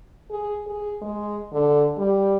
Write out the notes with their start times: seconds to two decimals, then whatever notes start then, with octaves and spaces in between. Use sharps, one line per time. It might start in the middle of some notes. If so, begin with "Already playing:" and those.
0.31 G#4
0.67 G#4
1.02 G#3
1.53 D3
1.97 G3